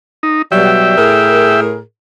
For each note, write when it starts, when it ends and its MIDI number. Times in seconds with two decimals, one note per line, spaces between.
0.23 0.42 63
0.52 0.93 47
0.52 0.93 54
0.52 0.93 55
0.52 1.61 76
0.52 1.61 79
0.97 1.79 45
0.97 1.79 68
0.97 1.79 70